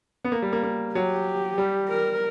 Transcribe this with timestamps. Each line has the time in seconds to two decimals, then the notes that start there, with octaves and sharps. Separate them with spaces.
0.24 B3
0.32 A#3
0.42 G3
0.52 A#3
0.63 A#3
0.95 F#3 G4
1.58 G3
1.88 A#4